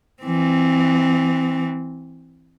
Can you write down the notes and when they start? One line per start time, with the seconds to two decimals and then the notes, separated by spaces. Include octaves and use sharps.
0.23 E3 C4